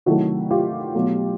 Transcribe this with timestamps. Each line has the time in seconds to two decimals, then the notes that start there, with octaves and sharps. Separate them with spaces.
0.06 C3 D#3 F#3 A3 E4 F#4
0.51 F4 G4
0.94 B2 F#3 A3